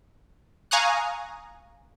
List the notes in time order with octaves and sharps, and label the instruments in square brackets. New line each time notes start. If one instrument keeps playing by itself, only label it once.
[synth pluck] F5 G#5 A#5 C#6 D#6 F#6